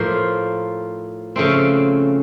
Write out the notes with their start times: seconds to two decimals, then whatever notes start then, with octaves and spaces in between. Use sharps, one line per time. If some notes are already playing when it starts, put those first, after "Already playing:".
Already playing: A2 F3 A#3 F4 C5
1.36 C#3 F3 A3 C4